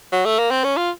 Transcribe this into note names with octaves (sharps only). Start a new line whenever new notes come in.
F#3
A3
A#3
C4
C#4
F4